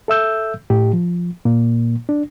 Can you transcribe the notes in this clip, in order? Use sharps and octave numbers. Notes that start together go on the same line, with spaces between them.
A4 E5 E6 G6
A2 G4
F3
A#2 A#3
D4